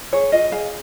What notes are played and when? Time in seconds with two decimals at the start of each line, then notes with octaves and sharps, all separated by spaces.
0.12 G#4 C#5
0.32 F4 D#5
0.52 G#4 F5